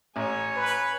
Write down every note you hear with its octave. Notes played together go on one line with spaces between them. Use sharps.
A1 C#5 G#5
B4